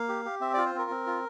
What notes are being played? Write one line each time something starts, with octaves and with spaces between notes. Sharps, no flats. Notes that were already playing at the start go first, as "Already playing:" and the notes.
Already playing: A#3 F5
G4
G4
C4 E5
F4 D5
C5
C4 A#4
C4
F4